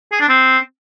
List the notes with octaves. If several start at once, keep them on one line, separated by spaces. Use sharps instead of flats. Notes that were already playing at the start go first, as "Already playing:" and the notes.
G#4
D4
C4